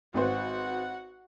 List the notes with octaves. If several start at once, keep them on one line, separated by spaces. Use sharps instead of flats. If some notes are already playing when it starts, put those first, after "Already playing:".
G#1 F#4 B4 C5 F#5